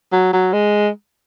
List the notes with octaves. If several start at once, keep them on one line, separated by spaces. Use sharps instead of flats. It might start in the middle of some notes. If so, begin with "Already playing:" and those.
F#3
F#3
G#3